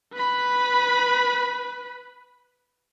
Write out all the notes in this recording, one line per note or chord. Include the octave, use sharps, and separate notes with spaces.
B4 B5